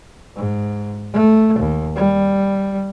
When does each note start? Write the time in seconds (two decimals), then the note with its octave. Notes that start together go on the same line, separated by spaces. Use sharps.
0.36 G#2
1.14 A3
1.59 D#2
1.96 G3